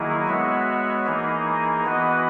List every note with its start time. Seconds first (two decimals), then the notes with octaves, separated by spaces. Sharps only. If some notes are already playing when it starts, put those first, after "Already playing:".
Already playing: D#3 F#3 A#3 E4 G#4
0.27 G#3 B3 F#4 C#5 E5
1.06 E3 A#3 D#4 G#4
1.85 E3 B3 F#4 B4 D#5